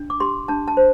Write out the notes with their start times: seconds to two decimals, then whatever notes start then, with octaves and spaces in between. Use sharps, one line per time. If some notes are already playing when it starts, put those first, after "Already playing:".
Already playing: D4
0.10 D6
0.20 G4 C6
0.48 D4 A5
0.68 A5
0.77 C5